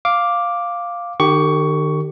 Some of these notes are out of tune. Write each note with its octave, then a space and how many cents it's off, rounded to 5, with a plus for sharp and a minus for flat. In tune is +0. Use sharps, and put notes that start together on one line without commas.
F5 +0 D6 +0
D#3 -40 G4 +0 C#6 +15